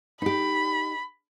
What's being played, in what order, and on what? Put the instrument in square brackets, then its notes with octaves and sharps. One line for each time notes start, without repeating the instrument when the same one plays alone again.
[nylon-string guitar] D#4 G4 [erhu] B5